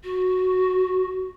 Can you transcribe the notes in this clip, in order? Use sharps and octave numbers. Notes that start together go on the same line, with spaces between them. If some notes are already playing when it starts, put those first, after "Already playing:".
F#4